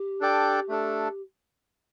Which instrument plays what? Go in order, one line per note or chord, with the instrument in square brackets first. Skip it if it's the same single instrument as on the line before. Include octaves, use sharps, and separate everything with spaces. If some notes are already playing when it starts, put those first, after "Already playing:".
Already playing: [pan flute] G4
[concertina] D4 A4 D5 G5
A3 D4 A4